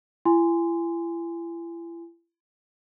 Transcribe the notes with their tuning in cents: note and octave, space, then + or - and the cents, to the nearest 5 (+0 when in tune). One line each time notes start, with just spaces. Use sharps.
E4 +40 G#5 -10 C6 -15